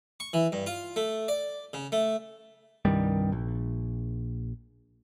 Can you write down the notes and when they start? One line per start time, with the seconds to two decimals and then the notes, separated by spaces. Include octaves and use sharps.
0.20 C#6
0.33 E3
0.52 G2
0.66 F4
0.96 A3
1.28 D5
1.73 C#3
1.92 A3
2.85 C2 G2 D#3 G3
3.32 A#1